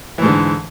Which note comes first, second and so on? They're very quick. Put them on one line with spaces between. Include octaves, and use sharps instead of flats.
E3 G#2 D3